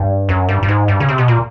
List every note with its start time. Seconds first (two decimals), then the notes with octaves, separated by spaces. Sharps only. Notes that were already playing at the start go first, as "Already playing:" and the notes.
Already playing: G2
0.29 F#2
0.49 G2
0.63 G2
0.68 G#2
0.88 G2
1.00 C#3
1.09 C3
1.18 B2
1.28 A#2